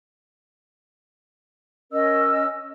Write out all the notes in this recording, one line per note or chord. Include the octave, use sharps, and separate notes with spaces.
C#4 A#4 D#5 E6